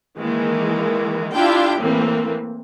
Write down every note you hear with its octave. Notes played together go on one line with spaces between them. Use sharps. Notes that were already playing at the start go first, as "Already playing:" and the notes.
D#3 E3 G#3 A#3
D4 E4 F4 G4 G5
A2 E3 A#3 C4